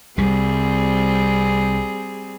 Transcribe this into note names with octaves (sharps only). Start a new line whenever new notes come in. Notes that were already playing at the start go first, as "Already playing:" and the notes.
C2 C3 G3 C4 G#4